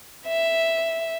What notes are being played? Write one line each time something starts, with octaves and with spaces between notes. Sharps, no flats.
E5